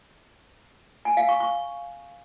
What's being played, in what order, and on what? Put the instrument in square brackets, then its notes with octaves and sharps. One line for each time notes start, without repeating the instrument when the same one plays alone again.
[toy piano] G#5
F5
C#6
C#6